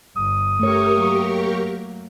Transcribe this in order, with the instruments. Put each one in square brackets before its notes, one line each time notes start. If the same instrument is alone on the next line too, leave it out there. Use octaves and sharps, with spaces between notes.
[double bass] G1 [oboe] D#6
[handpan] A3 C#5 [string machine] G4 A#4 C#6
[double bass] F#3 A#3